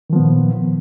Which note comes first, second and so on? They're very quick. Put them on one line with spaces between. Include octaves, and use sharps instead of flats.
D#3 F3 B3 A#2